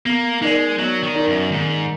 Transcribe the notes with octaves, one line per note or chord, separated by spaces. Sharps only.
A#3 B3
G#3 D#4 A#4 D5
F#3 B3
D#3
D#4 A#4 D5
F#2
G#2 D#3